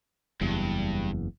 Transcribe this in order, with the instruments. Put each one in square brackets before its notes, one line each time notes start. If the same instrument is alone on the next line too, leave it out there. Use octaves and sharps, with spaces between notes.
[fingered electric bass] F#1 E2 [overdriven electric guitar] G2